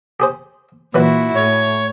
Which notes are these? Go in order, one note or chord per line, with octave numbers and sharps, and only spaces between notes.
G4 G#4 C5
A#2 E3 F#3 E4 F#4 B4
A2 C#5